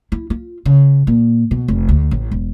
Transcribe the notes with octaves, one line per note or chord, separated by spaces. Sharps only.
E4
F4
C#3
A#2
B2
F1
D2
A1
E1